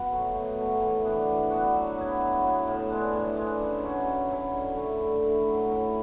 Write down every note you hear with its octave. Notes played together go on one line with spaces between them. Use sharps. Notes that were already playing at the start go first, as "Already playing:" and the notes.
Already playing: B3 F#4
F#3 A3
B2
F#3 A3
E3
B3 D4 F#4
E3
B3 D4 F#4
F#3
B3 E4
F#3
B3 E4
A2
G#3 D4
A2
G#3 D4
C#3
F#3 C#4 E4
C#3
F#3 C#4 E4
D3
A3 E4
D3
A3 E4
F#3
C#4 E4